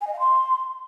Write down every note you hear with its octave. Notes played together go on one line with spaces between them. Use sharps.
G#5
D#5
F5
C6